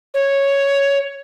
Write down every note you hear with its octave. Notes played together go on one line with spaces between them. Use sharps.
C#5